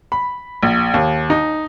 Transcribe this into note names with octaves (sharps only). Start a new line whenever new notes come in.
B5
A#1
D#2
D#4